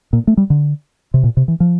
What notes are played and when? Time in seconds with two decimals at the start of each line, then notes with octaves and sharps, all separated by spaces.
0.13 A#2
0.27 A3
0.37 G3
0.50 D3
1.14 C3
1.23 A#2
1.37 C3
1.48 E3
1.60 F3